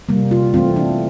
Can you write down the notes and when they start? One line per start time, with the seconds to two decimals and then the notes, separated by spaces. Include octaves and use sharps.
0.09 C3 G3 A#3
0.31 F4
0.54 E3 A3 C4 F4
0.76 D4